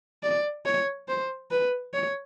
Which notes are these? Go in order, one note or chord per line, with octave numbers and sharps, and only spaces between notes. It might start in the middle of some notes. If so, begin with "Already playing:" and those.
D5
C#5
C5
B4
C#5